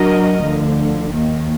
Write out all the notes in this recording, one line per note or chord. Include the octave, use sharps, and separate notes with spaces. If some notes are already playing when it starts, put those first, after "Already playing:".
Already playing: F#3 D4 F#4 A#4 D#5
D2 D3 F3
D#2 D#3 A#3